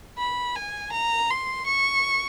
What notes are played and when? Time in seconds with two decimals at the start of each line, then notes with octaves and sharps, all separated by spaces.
0.18 B5
0.56 G#5
0.92 A#5
1.30 C6
1.67 C#6